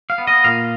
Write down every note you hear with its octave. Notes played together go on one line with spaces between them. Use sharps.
F5
B3
D#5
A#2 F5